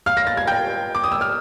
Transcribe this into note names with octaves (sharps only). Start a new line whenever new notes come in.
F5 F6
A#6
A6
G#6
G5 G6
D6
D#6
E6
F6